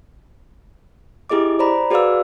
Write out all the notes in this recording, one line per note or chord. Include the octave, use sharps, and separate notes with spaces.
E4 G4 G#4 D#5 D6
C5 D5 A#5 B5
F#4 G#4 B4 D5 F5 E6